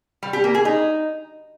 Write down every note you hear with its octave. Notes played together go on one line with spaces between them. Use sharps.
G3
G4
A#3
G#4
D#4